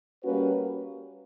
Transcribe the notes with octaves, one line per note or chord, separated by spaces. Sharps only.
G3 A#3 C#4 F#4 B4